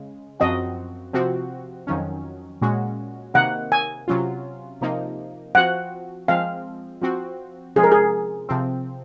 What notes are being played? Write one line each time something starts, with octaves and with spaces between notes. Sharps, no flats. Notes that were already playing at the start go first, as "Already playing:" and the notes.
Already playing: C#3 G#3
F#2 F3 C4 F#4 D#5
C3 F3 C4 F#4
F2 D#3 F#3 C#4
A#2 G#3 C#4 F#4
C3 D#3 A#3 F#5
G#5
C3 F#3 C#4 F4
C3 F3 A#3 D#4
F3 C4 F#4 F#5
F3 G#3 C4 F5
F3 C4 F#4
C3 F3 G#3 G#4
A#4
G#4
C3 F3 C4